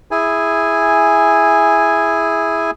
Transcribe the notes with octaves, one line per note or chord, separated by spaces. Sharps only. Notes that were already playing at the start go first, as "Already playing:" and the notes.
E4 G#4 G#5